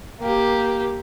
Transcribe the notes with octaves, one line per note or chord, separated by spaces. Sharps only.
A#3 G4